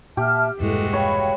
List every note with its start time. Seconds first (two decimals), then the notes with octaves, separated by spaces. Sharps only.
0.17 A#2 G4 E5 A5 F6
0.60 E1 G2 A#2 E3 G#3 E4 F#4 A4
0.93 C#5 F5 G5 B5